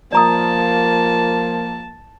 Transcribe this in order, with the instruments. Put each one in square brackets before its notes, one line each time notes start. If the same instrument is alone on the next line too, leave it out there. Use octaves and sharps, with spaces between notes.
[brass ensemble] F3 A#3 [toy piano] D5 A#5 D#6 [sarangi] A5